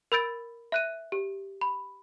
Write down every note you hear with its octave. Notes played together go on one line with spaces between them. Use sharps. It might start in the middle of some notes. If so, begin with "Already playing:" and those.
A#4 B5 E6 G6 A6 D7
E5 F#6 D#7
G4
B5